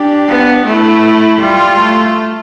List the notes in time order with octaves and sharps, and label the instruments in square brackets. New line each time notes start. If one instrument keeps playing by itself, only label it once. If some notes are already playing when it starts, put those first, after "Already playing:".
Already playing: [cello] D4 [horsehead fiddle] G4
[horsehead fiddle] B3
[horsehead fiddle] A3 [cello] E4
[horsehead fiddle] G3 [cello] F4
[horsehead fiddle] A3